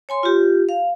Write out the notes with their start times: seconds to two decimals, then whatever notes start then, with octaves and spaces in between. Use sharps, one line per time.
0.09 C#5 G#5 C6
0.23 F4 G4
0.69 F5